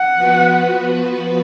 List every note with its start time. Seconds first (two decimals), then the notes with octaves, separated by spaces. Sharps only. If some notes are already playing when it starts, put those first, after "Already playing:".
Already playing: F#5
0.16 F3 B3 F#4 B4